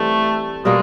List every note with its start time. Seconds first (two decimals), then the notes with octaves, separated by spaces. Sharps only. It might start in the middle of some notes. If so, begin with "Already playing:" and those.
Already playing: E3 G3 A3 C4
0.65 B2 G3 G#3 A#3